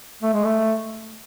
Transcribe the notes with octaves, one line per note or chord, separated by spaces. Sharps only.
A3
G#3
A3